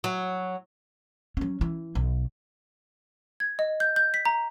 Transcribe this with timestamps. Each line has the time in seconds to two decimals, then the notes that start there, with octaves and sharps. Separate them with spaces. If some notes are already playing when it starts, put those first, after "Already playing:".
0.04 F#3
1.37 F#3 C#4
1.61 E3
1.95 B1
3.40 G#6
3.59 D#5
3.80 G6
3.96 G6
4.14 B6
4.25 A#5